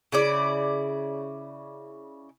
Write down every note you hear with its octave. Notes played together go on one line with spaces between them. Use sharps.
C#3 E4 D5